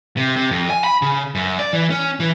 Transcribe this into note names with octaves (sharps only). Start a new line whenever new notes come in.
C3
C3
F2
G#5
B5
C#3
F#2
D5
E3
C#4
E3